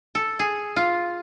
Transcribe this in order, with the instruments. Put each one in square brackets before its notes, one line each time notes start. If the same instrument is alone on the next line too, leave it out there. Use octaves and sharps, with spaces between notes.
[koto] A4
G#4
F4